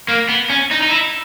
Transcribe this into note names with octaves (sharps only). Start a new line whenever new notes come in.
A#3
B3
C#4
D#4
D#4
E4